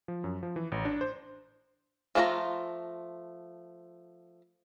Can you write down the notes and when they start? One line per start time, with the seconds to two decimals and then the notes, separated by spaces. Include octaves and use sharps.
0.08 F3
0.24 F#2
0.43 F3
0.56 E3
0.72 A1
0.85 D4
1.01 C5
2.15 F3 A3 D4 F4 A#5